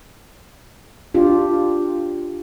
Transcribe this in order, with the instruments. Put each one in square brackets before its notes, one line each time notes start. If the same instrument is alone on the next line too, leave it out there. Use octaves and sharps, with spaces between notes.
[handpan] D4 F4 G4